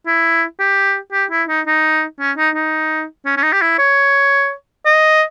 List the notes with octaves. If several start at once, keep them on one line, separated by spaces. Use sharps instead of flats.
E4
G4
G4
E4
D#4
D#4
C#4
D#4
D#4
C#4
C#4
D#4
G4
E4
C#5
D#5